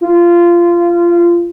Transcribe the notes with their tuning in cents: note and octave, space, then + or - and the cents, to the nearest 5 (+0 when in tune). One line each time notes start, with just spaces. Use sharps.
F4 -20